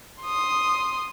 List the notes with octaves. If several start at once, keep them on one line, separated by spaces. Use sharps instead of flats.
C6 D#6